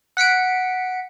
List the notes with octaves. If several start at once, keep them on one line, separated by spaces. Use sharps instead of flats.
F#5 B6 C#7 D7